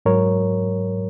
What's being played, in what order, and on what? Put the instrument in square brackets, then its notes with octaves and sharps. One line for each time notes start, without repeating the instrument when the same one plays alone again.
[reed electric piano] G#2 F#3 A#4 C#5